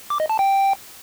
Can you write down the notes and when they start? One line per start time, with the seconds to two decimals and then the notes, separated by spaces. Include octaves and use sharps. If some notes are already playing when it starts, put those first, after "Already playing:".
0.10 D6
0.20 D#5
0.29 A5
0.39 G5